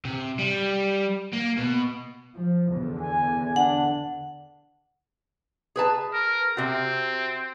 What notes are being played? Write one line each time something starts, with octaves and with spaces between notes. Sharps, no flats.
C3
G3
A#3
B2
F3
E2 D3
G#5
D4 F#5
G#4 B4 A5
A#4
C3 C4 F#4